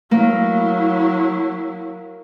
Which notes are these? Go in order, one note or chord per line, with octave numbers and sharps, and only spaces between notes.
F#3 A#3 E4